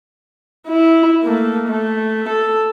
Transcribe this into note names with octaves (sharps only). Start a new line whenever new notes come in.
E4
A3 A#3
A3
A4